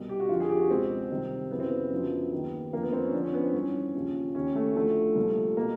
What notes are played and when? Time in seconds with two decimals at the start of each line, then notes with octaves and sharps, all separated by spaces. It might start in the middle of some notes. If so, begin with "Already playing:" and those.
Already playing: C2 B2
0.09 G4
0.20 F#4
0.29 F2 D3 F3 F4
0.40 G#4
0.49 G4
0.59 F#4
0.70 C#2 B2 C4
1.11 C2 C3 D#3
1.51 F#2 C#3 E3 B3
1.60 C4
1.69 B3
1.91 F#2 D3 F3
2.32 D#2 D#3
2.73 F2 D3 F3 A#3
2.83 B3
2.92 C4
3.04 C#4
3.13 F2 D3 F3 D4
3.23 C#4
3.34 B3
3.44 C4
3.53 G2 E3 C#4
3.94 D#2 C#3 F3
4.35 D#2 D#3 C#4
4.55 A3
4.75 D2 D3 F3 A3
5.16 C2 A#2 F3
5.57 B2 A#3